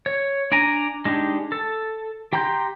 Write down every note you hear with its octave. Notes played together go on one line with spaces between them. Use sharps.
C#5
D4 D5 G#5 A#5
G#3 D4 D#4 G4
A4
G4 G5 A#5 C6 G6